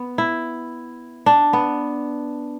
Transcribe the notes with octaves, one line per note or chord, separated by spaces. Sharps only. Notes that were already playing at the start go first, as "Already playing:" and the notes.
Already playing: B3
E4
D4
B3